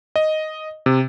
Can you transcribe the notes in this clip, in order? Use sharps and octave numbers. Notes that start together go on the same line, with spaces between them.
D#5
C3